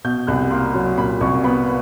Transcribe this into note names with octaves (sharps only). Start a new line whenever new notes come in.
B2 G6
C2 F#6
A#3 C6
F#3
A#2 B5
C2 C#6
B3 B5